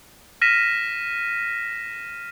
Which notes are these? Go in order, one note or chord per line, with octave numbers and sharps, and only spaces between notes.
F6 A#6 B6 D#7 E7